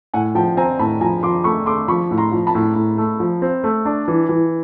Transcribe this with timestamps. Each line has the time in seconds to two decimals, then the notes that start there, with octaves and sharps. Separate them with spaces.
0.14 A2 F#5 G#5
0.35 F3 G5 A5
0.57 C4 G#5 A#5
0.79 A2 A5 B5
1.01 F3 G#5 A#5
1.23 F3 C6 D6
1.44 A3 B5 C#6
1.66 A3 C6 D6
1.88 F3 B5 C#6
2.11 A2
2.18 A#5 C6
2.32 F3
2.47 A5 B5
2.55 A2
2.76 A2
2.98 A3
3.20 F3
3.42 C4
3.64 A3
3.85 D4
4.08 E3
4.29 E3